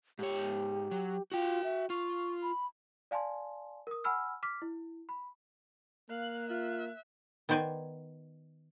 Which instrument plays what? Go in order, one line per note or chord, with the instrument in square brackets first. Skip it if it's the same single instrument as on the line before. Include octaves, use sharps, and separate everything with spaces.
[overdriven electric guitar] G#2 C#5 [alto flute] G4
[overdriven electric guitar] F#3
[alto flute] F4 [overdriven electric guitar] F#4 G5
[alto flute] E5
[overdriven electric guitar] F4 [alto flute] C#6
[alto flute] B5
[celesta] D5 F5 G#5 A5 C6
A#4 D#6
F#5 G#5 B5 E6 F6
D6 F6 B6
E4
B5
[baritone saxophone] A#3 [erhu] F5 [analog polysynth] F#6
[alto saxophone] F4 [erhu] E5
[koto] D#3 B3 C5 D5 G#5